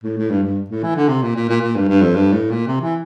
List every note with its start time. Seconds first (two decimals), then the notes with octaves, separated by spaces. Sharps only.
0.04 A2
0.17 A2
0.30 G2
0.43 G2
0.70 A2
0.83 E3
0.95 D3
1.09 C3
1.22 A#2
1.35 A#2
1.49 A#2
1.61 A#2
1.75 G2
1.88 G2
2.01 F2
2.15 G2
2.33 A2
2.50 A#2
2.67 C3
2.81 E3